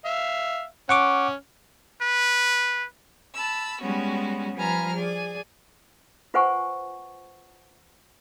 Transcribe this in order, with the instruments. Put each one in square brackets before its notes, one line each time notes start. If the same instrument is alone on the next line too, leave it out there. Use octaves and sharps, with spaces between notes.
[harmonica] E5 F5
[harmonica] C#4 [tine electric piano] F#5 C#6 D6
[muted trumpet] B4
[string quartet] A5 B5 E6
G3 G#3 B3 C#4 F#4
F3 G3 B4 G#5 A#5 F6
G#4 D5 G#5
[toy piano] F4 B4 C5 F#5 G#5 C#6